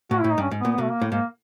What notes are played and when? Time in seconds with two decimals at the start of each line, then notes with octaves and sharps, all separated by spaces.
0.11 A2 F#4
0.21 E4
0.24 A2
0.31 D#4
0.38 G2 C#4
0.51 G#2
0.61 B3
0.65 A#2
0.72 B3
0.78 B2 A3
0.91 A#3
1.02 A2
1.11 G#2 A#3